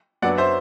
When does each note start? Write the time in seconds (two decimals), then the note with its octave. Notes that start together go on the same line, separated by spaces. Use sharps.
0.22 F#2 F#3 B3 D4 D5 F#5
0.38 C5 E5